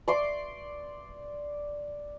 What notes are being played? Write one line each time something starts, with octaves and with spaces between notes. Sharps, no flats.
D5 C6 D6